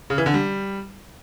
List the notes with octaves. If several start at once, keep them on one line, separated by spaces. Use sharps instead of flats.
C#3
E3
D3
G3